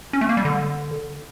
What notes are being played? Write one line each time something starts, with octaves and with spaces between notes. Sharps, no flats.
C#4
A3
A#3
G3
D3